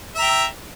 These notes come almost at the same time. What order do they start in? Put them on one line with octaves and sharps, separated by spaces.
E5 A#5 G5